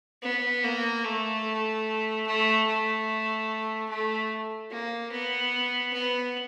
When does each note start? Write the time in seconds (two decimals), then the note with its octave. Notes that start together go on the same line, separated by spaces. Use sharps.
0.23 B3
0.64 A#3
1.04 A3
2.26 A3
2.67 A3
3.89 A3
4.71 A#3
5.12 B3
5.93 B3